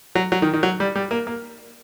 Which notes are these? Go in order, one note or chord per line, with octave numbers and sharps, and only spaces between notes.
F#3
F#3
D#3
D#3
F#3
G3
G3
A#3
A#3